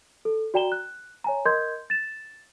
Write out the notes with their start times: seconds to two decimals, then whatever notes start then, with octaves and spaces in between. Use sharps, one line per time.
0.25 A4
0.54 F#4 D5 G5 A#5 E7 G7
0.72 F#6
1.24 C#5 G#5 A#5
1.45 A#4 D#5 C6 G6 G#6
1.90 A6 E7